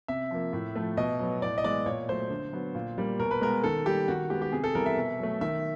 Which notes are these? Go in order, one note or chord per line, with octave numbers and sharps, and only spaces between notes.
C3 E5
F3 A#3
A2
F3 A3
B2 D#5
F#3 B3
A2 D5
D#5
E3 G#3 B3 D5
A#2 C#5
F#3 A3 C5
D3
F#3 B3
A#2
G3 A#3
B2 A#4
B4
G#3 B3 A#4
D#3 A4
G3 A#3 G4
D#3 F#4
G#3 B3 G4
G4
C3 G#4
A4
E3 G3 B3 A#4
E5
B2
F#3 A3
D#3 E5